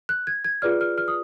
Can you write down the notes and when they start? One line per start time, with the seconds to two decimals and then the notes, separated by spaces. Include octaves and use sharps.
0.09 F#6
0.27 G#6
0.45 G#6
0.62 F4 G#4 B4 D5 F6
0.81 F6
0.98 F6
1.08 D#6